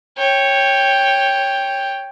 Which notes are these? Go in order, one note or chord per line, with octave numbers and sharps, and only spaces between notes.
C#5 G5